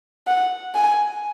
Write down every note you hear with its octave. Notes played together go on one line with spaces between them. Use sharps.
F#5
G#5